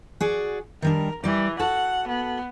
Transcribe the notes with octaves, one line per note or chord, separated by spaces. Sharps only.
F#4 G#4 D5
D#3 G3 D4 A#4
E3 G3 D5
F#4 A4 F#5 A5
B3